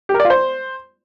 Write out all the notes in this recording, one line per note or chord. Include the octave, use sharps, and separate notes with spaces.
G4
A#4
D5
F4
C5